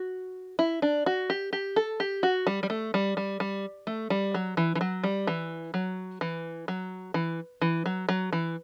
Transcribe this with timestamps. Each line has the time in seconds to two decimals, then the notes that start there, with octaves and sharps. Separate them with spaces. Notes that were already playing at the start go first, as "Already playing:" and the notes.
Already playing: F#4
0.59 E4
0.82 D4
1.06 F#4
1.30 G4
1.53 G4
1.76 A4
2.00 G4
2.23 F#4
2.47 G3
2.63 G3
2.70 A3
2.94 G3
3.17 G3
3.40 G3
3.87 A3
4.10 G3
4.34 F#3
4.57 E3
4.75 E3
4.81 F#3
5.04 G3
5.27 E3
5.74 F#3
6.21 E3
6.68 F#3
7.14 E3
7.62 E3
7.86 F#3
8.09 F#3
8.33 E3